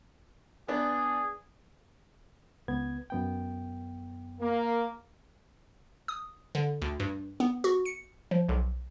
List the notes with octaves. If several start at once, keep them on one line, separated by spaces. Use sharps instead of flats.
B3 D4 G#4
C#2 B3 G#6
F#2 B3 G5
A#3
D#6
D3
D2
G2
B3
F#4
C#7
F3
B1